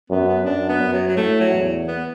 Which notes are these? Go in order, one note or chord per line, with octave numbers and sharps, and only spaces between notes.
F#2 B3
B3
F#2 D4
B3
F#2
F#3
F#3
A2 A3
F#3
E2
B3